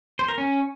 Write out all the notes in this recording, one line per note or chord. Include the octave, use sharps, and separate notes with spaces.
C5
A#4
C#4